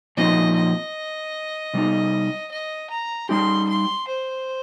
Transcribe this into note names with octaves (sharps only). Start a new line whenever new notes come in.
A#2 F3 C4 D#4 D#5
D#5
C3 G3 D#4
D#5
A#5
G3 D#4 G4 C6
C6
C5